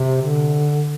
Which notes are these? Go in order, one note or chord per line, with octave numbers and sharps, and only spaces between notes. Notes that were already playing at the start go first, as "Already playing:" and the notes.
Already playing: C3
D3